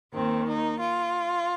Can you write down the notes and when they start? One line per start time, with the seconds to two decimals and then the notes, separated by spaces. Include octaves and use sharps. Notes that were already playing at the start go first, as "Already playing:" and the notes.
0.14 D#2 D#3 C4
0.46 D#4
0.79 F4